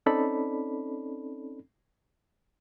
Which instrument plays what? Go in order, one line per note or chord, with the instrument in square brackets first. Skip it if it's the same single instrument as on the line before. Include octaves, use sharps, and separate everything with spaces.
[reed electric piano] C4 C#4 D#4 A4 D5 B5